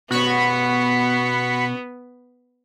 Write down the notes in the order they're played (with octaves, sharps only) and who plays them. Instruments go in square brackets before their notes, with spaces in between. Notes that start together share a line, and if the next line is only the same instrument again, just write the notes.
[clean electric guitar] B2 C#4 [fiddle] B3 [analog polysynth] F#4 B5 C#6